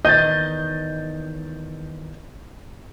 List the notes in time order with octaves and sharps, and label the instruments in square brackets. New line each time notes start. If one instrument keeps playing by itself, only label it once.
[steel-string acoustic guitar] E2 D#3 [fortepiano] D#5 [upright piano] G6 A6